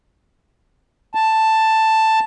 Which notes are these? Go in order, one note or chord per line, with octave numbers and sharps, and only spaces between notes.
A5